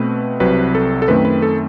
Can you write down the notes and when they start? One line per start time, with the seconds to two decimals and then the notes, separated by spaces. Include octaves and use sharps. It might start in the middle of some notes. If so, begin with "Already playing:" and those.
Already playing: B2 A3 C4 B4
0.40 C2 C3 F#3 C4 B4
0.75 A4
1.02 A4
1.08 F#2 D#3 A3 C4 B4
1.25 B4
1.42 A4